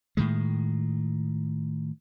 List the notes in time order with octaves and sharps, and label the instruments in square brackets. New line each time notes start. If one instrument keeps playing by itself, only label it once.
[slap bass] A2 D#3 G#3